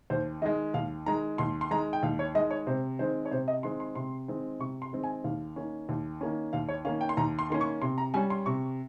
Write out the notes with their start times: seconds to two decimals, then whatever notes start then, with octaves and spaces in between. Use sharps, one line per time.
0.10 D#2 C5
0.42 D#3 G#3 D#5
0.74 D#2 F5
1.06 D#3 G#3 A#5
1.38 D#2 C6
1.61 C6
1.71 D#3 G#3 A#5
1.93 G5
2.03 D#2 F5
2.19 C#5
2.35 D#3 G#3 D#5
2.51 C#5
2.67 C3 C5
2.99 D#3 G#3 C4 C5
3.25 C#5
3.31 C3 C5
3.48 D#5
3.63 D#3 G#3 C4 C6
3.80 C6
3.95 C3 C6
4.28 D#3 G#3 C4
4.60 C3 C#6
4.82 C6
4.93 D#3 G#3 C4
5.03 G#5
5.24 D#2 F5
5.56 D#3 A#3 C#4
5.89 D#2
6.21 D#3 A#3 C#4
6.53 D#2 F5
6.69 C#5
6.85 D#3 A#3 C#4 F5
7.01 G5
7.09 C6
7.17 D#2 A#5
7.39 C6
7.50 D#3 A#3 C#4 C6
7.61 C#6
7.82 C3 C6
7.98 A#5
8.14 G3 C#4 G#5
8.30 C6
8.46 C3 C#6